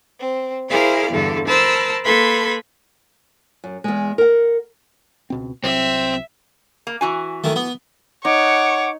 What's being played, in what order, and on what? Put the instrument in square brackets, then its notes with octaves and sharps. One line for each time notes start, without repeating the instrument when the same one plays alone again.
[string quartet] C4
E4 G#4 A#4 C5 D5 F5
E2 G2 D3 A4
A#4 C5 A5 B5 E6
A#3 A4 B4 B5 C6 G#6
[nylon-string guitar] F#2
E2 G#3
A#4 F#5
[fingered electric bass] C#2 B2 C4
[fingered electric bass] C2 F#3 [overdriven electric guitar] C4 [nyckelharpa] E5
[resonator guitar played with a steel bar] A#3
E3 F#4 G#5
[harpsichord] D#3 A3
B3
[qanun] D#4 [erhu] C#5 [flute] F#5 [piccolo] D6